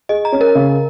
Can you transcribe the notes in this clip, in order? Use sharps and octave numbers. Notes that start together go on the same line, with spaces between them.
G#4 D#5
A#5
C#4
A#4
C#3